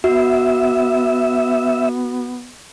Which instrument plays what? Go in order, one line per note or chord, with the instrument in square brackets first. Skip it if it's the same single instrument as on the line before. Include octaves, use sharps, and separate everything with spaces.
[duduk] B3 [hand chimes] F#4 [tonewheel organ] E5